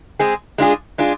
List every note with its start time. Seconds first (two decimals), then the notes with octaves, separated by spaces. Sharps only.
0.19 G#3 C4 G#4
0.58 G#3 D4 F4 G#4
0.98 G#3 D4 F4 G#4